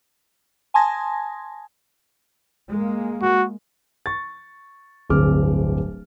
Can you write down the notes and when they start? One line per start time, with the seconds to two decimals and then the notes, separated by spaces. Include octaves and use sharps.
0.74 G#5 A5 C6 D#6 G#6 A#6
2.70 G#3 A#3
3.22 F#4
4.06 C#6 A6
5.09 D1 G1 C4 G#4 D6 F6